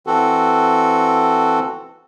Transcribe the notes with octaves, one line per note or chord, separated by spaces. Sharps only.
E3 C4 F#4 A4